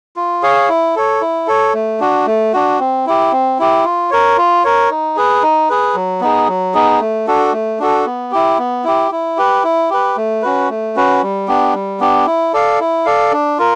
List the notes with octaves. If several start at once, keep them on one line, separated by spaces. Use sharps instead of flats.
F4
G#4 C#5 F5
E4
A4 C#5
E4
A4 C#5
A3
D4 F#4
A3
D4 F#4
C4
E4 G4
C4
E4 G4
F4
A#4 C#5
F4
A#4 C#5
D#4
G#4 B4
D#4
G#4 B4
F#3
B3 D#4 G#4
F#3
B3 D#4 G#4
A3
D4 F#4 A4
A3
D4 F#4 A4
B3
E4 G4
B3
E4 G4
E4
G4 B4
E4
G4 B4
A3
C#4 F#4 B4
A3
C#4 F#4 B4
G3
B3 D4 G4
G3
B3 D4 G4
E4
A4 D5 F5
E4
A4 D5 F5
D4
F4 A#4